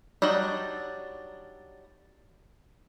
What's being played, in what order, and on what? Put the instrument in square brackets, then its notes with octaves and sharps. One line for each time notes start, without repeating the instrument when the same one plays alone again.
[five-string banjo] F#3 G3 D4 D#4